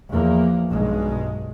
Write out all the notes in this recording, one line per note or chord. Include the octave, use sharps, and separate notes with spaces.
E2 F3 A#3
B1 G2 G#3